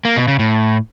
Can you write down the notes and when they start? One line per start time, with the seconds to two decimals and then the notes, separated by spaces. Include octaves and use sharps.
0.05 A#3
0.16 B2
0.28 C#3
0.39 A2